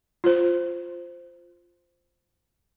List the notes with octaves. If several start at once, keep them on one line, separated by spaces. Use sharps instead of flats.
F4 C5